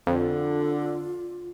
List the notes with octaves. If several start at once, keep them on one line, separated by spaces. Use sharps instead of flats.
F2 D3 F4